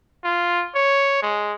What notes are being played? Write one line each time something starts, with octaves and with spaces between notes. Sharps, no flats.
F4
C#5
G#3